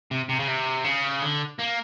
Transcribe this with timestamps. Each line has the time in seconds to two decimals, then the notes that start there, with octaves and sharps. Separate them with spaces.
0.11 C3
0.29 C3
0.39 C#3
0.48 C3
0.84 C#3
1.22 D3
1.59 A#3